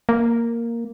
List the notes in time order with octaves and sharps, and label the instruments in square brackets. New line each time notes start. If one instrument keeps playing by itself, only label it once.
[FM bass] A#3